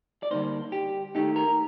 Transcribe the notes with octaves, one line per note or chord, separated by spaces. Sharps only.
D5
D3 G3 A#3 D#4 C5
G4
D#3 A3 D#4 G4
A#4